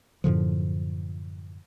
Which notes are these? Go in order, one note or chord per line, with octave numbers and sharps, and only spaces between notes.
F#2 A2 D3 F3